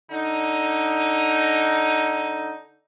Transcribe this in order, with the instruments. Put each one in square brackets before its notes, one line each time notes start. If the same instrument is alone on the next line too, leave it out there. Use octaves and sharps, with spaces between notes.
[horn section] D3 D#4